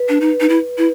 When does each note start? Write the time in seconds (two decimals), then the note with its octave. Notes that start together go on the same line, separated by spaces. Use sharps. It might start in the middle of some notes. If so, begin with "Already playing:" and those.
Already playing: B4
0.09 D4
0.21 D#4
0.40 D#4
0.49 E4
0.78 E4